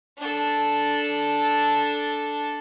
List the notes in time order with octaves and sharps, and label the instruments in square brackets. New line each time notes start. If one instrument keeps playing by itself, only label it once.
[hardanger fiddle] D4 A4